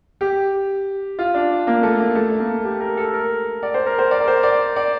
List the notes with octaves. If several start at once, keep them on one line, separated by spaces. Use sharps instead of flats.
G4
F4
D4
A#3
A3
A#3
A3
A#3
G4
A#4
A4
A#4
D5
C5
A#4
C5
D5
A#4
C5
D5
D5